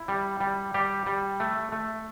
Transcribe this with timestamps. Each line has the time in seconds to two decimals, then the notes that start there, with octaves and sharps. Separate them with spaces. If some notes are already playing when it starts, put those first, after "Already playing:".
Already playing: E4
0.08 G3
0.40 G3
0.74 G3 G4
1.06 G3
1.40 A3
1.72 A3